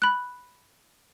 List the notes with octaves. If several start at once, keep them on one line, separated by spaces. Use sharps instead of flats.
B5 F#6